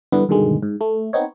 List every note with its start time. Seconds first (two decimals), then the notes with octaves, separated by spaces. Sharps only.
0.12 G2 D3 E3 B3
0.29 G2 B2 D3 D#3 G#3
0.62 G#2
0.81 A3
1.13 B3 C4 D#4 C#5